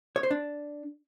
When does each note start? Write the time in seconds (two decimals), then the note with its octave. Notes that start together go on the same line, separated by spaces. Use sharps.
0.16 C#5
0.23 C5
0.31 D4